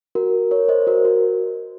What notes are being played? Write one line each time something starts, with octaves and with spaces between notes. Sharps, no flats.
F#4 A#4
A#4 C#5
C5 D#5
F#4 A#4
F#4